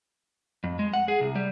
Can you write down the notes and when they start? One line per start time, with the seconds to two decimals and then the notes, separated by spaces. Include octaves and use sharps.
0.64 F2
0.79 G#3
0.94 F#5
1.08 G#4
1.20 C2
1.35 G3